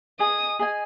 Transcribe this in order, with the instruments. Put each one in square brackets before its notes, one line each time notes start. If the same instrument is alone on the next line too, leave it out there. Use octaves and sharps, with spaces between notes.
[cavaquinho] G#4 D#5 G#5 [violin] D#6
[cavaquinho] G#4 D#5 G#5